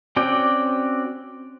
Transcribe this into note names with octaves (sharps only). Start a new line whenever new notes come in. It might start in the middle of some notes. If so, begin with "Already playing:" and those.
C4 C#4 F#4 D5 G5